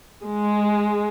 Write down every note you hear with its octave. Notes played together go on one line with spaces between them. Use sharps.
G#3